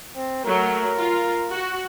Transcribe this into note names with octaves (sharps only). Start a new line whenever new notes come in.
C4
F#3 A3 A#4
F4
F#4